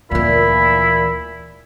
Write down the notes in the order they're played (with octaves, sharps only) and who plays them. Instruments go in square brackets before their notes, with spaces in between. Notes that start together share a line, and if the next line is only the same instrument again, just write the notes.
[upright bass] D2 E3 [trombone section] A#2 [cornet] E4 [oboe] B5